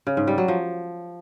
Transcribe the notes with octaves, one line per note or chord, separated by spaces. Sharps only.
C#3
G#2
G3
F#3
F3